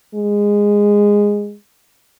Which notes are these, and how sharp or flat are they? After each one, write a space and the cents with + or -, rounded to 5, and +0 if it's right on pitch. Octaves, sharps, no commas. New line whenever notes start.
G#3 -15